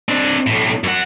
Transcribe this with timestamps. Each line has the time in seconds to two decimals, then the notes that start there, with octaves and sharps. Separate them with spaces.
0.09 C4 D4
0.47 B1 A2
0.84 F#2 F#5